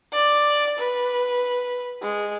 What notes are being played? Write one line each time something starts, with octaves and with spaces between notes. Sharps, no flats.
D5
B4
G#3